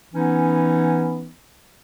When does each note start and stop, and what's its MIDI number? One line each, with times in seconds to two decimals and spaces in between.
0.14 1.29 52
0.14 1.29 59
0.14 1.29 61
0.14 1.29 63